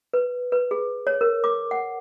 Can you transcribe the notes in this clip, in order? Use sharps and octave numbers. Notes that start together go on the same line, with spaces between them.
B4
B4
G#4
C#5
A#4
D6
F#5